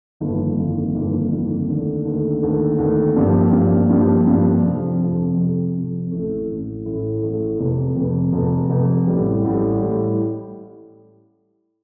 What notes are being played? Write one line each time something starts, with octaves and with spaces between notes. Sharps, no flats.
G1 F2 D#3 A#3 F4
G1 F2 D#3 A#3 F4
G1 F2 D#3 A#3 F4
G1 F2 D#3 A#3 F4
D#2 D3 A3
D#2 D3 A3
D#2 D3 A3
D#2 D3 A3
G2 F3 A#3 D4 G4
G2 F3 A#3 D4 G4
G2 F3 A#3 D4 G4
G2 F3 A#3 D4 G4
F2 C3 F3
F2 C3 F3
F2 C3 F3
F2 C3 F3
A1 A2 A3
A1 A2 A3
A1 A2 A3
A1 A2 A3
F1 F2 C3
F1 F2 C3
F1 F2 C3
F1 F2 C3
A1 A2 G3
A1 A2 G3
A2 G3